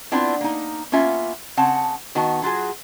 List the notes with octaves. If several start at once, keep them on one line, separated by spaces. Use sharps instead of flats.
B3 C4 D4 E4 F4
A#3 D#4
A#3 B3 C#4 F4 E5
C#3 C4 F#5 A5
D#3 B3 F#4 A5
F#3 F4 F#4 G#4